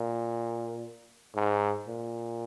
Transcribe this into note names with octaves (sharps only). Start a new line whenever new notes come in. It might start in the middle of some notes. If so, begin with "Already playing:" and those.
Already playing: A#2
G#2
A#2